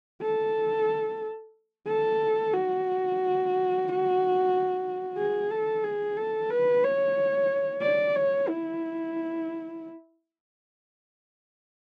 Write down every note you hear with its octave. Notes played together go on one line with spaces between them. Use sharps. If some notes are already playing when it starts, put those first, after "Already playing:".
A4
A4
F#4
G#4
A4
G#4
A4
B4
C#5
D5
C#5
E4